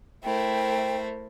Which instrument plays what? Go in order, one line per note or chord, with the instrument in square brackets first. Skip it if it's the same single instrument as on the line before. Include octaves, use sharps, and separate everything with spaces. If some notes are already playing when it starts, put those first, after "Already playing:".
[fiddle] A3 C5 [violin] E4 A#4 [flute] G5